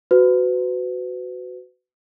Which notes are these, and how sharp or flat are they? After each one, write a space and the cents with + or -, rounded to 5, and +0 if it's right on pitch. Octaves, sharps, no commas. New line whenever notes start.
F#4 +0 B4 +30